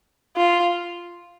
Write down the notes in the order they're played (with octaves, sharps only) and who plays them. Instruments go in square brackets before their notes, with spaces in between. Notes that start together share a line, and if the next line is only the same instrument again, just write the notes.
[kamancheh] F4